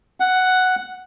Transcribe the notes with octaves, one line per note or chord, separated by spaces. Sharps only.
F#5